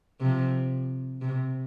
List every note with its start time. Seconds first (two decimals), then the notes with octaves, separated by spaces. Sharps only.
0.21 C3 F3
1.21 C3